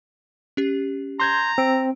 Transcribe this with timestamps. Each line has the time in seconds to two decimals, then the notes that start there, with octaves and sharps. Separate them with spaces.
0.57 C#4 G4
1.20 A#5 C6 G6 G#6
1.58 C4 E6 D7